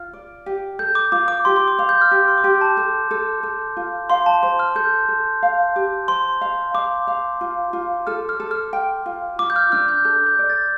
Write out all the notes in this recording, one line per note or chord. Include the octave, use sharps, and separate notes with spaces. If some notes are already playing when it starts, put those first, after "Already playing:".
Already playing: F4 F6
D5
G4
A4 G6
D6
F4 D6
D6
G4 C6
C6
D6
F5
G6
F6
G4 D6
C6
D6
G4 C6
A5
A4
A4
A4
F4
F5 C6
A5
C5 C6
F6
A4 G6
A4
F5
G4
C5 C6
F5
F5 D6
F5
F4
F4
A4 F6
F6
A4
F6
G5
F4
F4 D6
G6
F6
D4 F6
G6
A4 G6
G6
D5
A6